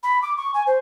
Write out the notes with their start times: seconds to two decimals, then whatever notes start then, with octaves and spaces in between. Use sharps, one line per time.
0.03 B5
0.22 D6
0.37 C#6
0.54 G#5
0.67 C5